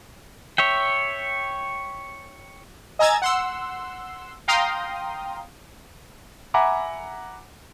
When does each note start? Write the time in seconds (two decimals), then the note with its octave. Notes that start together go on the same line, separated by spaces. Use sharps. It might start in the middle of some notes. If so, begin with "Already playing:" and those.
0.58 C#5 E5 G5
2.99 D#5 G#5 A#5 E6 G#6 A6
3.22 F#5 C6 E6
4.48 F5 G5 A#5 C6 D#6
6.54 E5 F#5 G#5 A#5 B5 D6